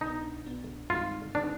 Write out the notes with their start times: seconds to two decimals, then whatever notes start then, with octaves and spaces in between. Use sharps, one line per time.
0.01 C2 B2 B3 D4 D#4
0.46 C2 B2 B3 D4
0.89 G2 D#3 G#3 C4 D#4 F4
1.34 D#3 G#3 C4 D4 D#4